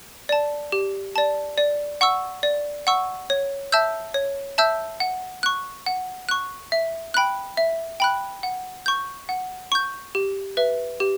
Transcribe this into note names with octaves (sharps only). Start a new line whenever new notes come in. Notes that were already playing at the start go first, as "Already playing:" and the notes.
D5 A5
G4
D5 A5
D5
F#5 C#6 E6
D5
F#5 C#6 E6
C#5
E5 A5 E6 G6
C#5
E5 A5 E6 G6
F#5
C#6 F#6
F#5
C#6 F#6
E5
G5 B5 F#6
E5
G5 B5 F#6
F#5
C#6 G6
F#5
C#6 G6
G4
B4 E5
G4